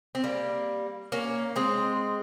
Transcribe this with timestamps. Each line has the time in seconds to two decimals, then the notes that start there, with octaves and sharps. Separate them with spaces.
0.15 C4
0.24 G3 A#3
1.12 A#3 C#4
1.56 G#3 C4